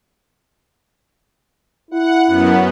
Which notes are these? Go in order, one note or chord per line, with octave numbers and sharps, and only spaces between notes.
E4 F#5
F#2 B3